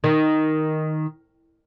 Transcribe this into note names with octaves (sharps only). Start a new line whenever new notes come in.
D#3